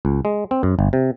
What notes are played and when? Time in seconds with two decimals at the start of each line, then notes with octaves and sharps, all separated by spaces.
0.05 C#2
0.25 G#3
0.51 C4
0.63 F#2
0.79 G1
0.93 C3